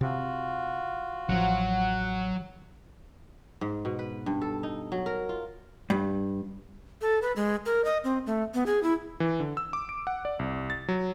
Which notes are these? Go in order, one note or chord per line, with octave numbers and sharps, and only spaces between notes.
C3 F4 F#4
A1 F3 F#3 F#5
G#2
B2
B4
G2
A4
D#4
F#3
A#4
F4
G2
A4
B4
G#3
A#4
D#5
C4
A3
B3
G#4
E4
E3
D3
E6
D6
D7
F#5
D5
C2
A6
F#3